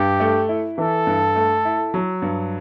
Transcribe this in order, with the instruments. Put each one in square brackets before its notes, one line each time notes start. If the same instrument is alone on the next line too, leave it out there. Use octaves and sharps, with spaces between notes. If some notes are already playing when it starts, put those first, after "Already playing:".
Already playing: [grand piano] G2 [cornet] G4
[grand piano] A3
E4
[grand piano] E3 [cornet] A4
[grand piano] G2
A3
E4
F#3
G2